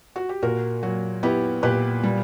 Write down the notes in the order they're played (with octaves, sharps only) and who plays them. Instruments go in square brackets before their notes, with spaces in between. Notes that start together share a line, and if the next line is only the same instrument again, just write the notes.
[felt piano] F#4
G4
A#2 F#4 A#4
F#3 F#4
B3 E4 G4
A#2 G4 B4
G3